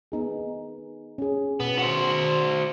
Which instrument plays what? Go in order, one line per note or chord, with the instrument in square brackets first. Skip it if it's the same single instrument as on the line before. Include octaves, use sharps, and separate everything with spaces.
[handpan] B3 D#4 G#4
C#4 G#4
[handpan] B2 [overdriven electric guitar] B3
[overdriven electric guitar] F#4 C5